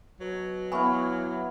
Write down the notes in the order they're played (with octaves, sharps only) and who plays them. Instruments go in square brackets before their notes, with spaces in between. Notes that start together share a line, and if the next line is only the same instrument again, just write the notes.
[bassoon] B2 [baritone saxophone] F#3
[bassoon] E3 [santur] B3 F5 [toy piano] G#5 B5 C#6